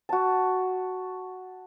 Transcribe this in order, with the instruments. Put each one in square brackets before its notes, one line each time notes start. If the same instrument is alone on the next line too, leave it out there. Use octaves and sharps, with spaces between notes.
[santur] F#4 A5